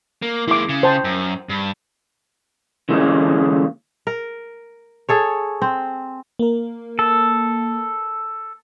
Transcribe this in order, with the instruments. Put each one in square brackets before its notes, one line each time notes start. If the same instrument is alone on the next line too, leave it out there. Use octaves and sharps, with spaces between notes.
[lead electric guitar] A#3
[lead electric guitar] G#3 A#3 [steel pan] E4 D6
[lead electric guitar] C#3
[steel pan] C5 G5 A5
[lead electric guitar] F#2
G2
[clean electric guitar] D3 E3 G#3 A#3 C4 C#4
[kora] A#4
G#4 A4 C#5
C4
[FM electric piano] A#3 A#4
[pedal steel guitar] A4